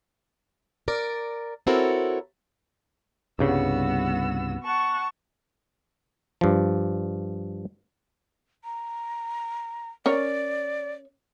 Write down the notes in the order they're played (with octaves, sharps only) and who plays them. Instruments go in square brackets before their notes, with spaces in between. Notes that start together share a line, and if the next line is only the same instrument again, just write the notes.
[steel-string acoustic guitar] A#4 D5
C4 E4 F#4 A4 A#4 C#5
[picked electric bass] C2 G2 C#3 [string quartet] B3 F#4 E6
[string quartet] F#5 A5 C#6
[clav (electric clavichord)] G2 F3
[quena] A#5
[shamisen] C#4 A#4 C#5 [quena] D5